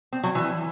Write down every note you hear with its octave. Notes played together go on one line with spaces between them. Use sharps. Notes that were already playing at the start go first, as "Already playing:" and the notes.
C4
F#3
E3